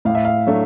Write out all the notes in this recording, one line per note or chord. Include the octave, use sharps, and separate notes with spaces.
A2 F5
E5
F5
F#3 A3 D4